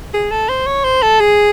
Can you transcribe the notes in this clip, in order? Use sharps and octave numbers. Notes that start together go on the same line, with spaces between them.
G#4
A4
C5
C#5
C5
A4
G#4